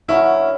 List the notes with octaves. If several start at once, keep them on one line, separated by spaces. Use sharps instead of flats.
F#2 D3 F#3 C#4 E4